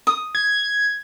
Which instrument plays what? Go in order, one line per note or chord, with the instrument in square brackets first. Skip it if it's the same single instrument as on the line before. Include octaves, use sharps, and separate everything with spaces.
[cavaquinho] D#6
[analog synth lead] G#6